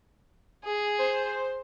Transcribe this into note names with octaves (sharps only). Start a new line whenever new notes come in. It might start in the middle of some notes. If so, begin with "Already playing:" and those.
G#4
C5